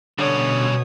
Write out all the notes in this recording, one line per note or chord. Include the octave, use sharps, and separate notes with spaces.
B2 D3 G3 C#4 C#5 D#6